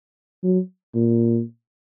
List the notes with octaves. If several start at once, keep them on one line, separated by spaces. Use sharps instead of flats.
F#3
A#2